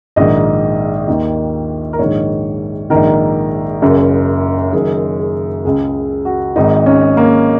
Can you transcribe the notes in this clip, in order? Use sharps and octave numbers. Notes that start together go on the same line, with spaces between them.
A#1 G#2 D#3 D#5
D#2 D#3
A#4
A#1 G#2 D#3 C#5
A#1 G#2 D#3 A#4
F#1 F#2 C#3
F#1 F#2 D#3 G#4
G#4
C#2 C#3 G#4
F#4
G#1 G#2 D#3 D#4
C#4
A#3